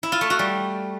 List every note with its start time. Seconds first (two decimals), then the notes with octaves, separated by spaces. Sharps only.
0.03 E4
0.12 F4
0.21 A3
0.30 F#4
0.39 G3